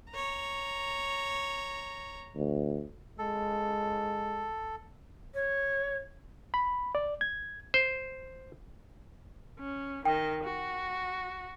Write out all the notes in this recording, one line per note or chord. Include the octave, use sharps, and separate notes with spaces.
C#5 A#5
D2
G#3 A4
C#5
B5
D5
G#6
C5
C#4
D#3 D#5 G5
F#4